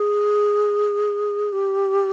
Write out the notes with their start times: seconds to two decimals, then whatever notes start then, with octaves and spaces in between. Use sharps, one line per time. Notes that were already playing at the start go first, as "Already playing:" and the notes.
Already playing: G#4
1.52 G4